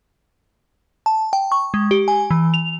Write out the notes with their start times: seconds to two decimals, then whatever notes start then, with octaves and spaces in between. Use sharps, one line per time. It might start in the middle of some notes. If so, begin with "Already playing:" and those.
1.06 A5
1.33 G5
1.52 C#6
1.74 G#3
1.91 G4
2.08 G#5
2.31 E3
2.54 F7